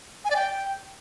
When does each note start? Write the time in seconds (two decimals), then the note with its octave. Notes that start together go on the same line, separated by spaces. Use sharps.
0.25 G#5
0.30 D5
0.36 G5